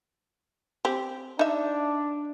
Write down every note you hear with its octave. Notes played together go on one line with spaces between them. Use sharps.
C4 G4
D4 D#4 E5